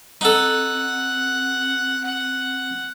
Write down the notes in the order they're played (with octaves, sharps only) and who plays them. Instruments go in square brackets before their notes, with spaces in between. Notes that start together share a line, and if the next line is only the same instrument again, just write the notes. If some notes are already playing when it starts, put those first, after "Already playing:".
[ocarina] C4 [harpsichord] D#4 A4 [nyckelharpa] F#5